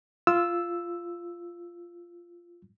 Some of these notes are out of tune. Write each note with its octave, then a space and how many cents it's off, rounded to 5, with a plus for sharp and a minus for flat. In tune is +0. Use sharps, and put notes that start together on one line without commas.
F4 -10 E6 +0